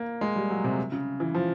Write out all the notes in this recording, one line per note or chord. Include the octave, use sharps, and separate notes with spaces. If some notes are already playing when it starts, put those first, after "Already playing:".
Already playing: A#3
G#3
G3
F#3
C3
C#3
E3
F3